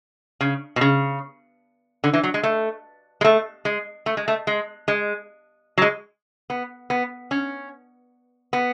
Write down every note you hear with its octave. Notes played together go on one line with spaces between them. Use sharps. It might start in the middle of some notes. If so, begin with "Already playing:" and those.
C#3
B2
C#3
D3
E3
F#3
G#3
A3
G#3
A3
G#3
A3
G#3
A3
G#3
G#3
F#3
G#3
B3
B3
C#4
B3